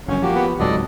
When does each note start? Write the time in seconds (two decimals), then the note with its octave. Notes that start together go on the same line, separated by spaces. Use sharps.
0.08 F#1 F#2 C#4
0.22 F3 A#3 F#4 G4
0.35 B3
0.60 G#1 C#2 G#2 F#3 A4 D5 D#5